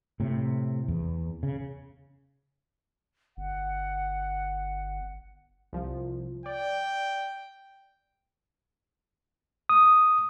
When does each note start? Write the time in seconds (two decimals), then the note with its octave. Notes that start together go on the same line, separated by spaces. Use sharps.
0.20 A2 C3
0.88 E2
1.43 C#3
3.37 G1 F#5
5.73 C2 F3
6.46 D5 G5
9.69 D#6